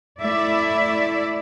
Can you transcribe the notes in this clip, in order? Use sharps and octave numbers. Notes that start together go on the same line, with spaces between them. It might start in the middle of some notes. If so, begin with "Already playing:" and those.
A3 E4 D5 E5